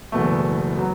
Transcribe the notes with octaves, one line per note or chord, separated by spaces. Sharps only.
F#1 E2 B2 A3
F#3 B3